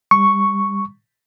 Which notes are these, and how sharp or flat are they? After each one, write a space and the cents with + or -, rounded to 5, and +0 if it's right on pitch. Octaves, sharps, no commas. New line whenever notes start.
G3 +30 C#6 +0